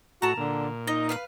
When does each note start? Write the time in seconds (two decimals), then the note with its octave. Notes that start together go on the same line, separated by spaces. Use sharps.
0.22 A2 F#4 A5 A#5
0.37 A#2 D3
0.87 D#4 D#5
1.09 B4 F5 F#6